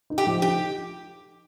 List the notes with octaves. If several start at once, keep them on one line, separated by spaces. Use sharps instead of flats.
D#4
G4
F3
D#4 G4